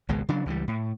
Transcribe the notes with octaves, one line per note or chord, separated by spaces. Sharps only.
G#1 C#2 B2 G#3
C#3 F#3 D4
C#2 E3 F#3 G3
A2